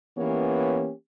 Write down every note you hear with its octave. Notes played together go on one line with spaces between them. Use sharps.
E3 A#3 B3 C#4 G4 C#5